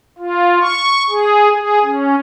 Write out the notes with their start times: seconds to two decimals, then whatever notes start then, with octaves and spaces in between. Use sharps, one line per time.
0.18 F4
0.61 C#6
1.09 G#4
1.54 G#4
1.84 C#4